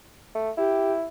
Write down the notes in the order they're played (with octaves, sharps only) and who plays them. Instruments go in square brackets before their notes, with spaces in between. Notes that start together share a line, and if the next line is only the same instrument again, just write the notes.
[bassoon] A3
[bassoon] E4 [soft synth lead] G4